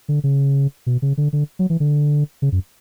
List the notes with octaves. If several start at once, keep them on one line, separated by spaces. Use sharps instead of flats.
D3
C#3
B2
C#3
D3
D3
F#3
E3
D3
C#3
F#2